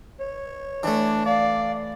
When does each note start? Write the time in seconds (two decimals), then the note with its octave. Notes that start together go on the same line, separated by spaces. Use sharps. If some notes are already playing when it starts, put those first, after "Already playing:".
0.20 C#5
0.83 E3 A3 D4
1.26 D5 F5